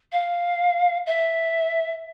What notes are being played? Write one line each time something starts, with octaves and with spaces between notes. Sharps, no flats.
F5
E5